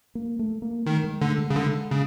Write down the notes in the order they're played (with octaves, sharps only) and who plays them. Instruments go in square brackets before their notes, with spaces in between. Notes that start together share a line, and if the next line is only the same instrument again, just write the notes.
[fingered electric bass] A#3
A3
A#3
[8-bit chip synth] D#3 [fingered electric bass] A3
[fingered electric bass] G#3
[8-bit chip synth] D3 [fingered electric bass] A3
[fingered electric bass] G#3
[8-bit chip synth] C#3
[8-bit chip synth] D3 [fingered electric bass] G#3
[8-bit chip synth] C#3